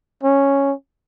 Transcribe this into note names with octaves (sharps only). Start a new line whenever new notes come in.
C#4